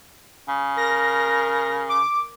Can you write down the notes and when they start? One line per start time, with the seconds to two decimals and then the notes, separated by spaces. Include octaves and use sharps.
0.48 C#3
0.77 A#4 A#6
1.89 D6